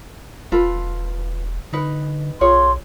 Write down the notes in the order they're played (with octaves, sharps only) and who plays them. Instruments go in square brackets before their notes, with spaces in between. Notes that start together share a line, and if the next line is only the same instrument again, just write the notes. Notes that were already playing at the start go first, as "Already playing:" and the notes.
[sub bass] E1 [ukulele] F4 A4 B4
[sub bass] D3 [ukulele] D#4 B4
[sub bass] B1 [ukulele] F4 G#4 C#5 [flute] C6